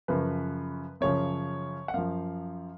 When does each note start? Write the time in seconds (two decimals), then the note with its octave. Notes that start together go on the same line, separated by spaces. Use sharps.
0.08 F#2 C#3 F3 B4
1.01 F#2 C#3 F3 C#5
1.88 F#5
1.94 F#2 F3 F5